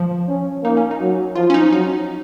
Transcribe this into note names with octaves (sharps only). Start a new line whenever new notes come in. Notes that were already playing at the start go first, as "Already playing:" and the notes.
Already playing: F3
C#4
A#3 D#4
C#4
D#4
F#3
F3 F4
C#4
D#4
F#3 D#4